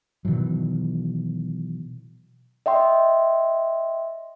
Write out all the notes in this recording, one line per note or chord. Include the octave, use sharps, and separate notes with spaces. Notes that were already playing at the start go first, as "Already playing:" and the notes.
B2 D#3 E3 F#3
D#5 E5 G5 C6